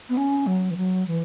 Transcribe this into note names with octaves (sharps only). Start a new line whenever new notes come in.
B3
C#4
F#3
E3
F#3
E3